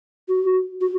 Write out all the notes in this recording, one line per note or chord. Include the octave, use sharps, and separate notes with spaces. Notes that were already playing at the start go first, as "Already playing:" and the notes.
F#4
F#4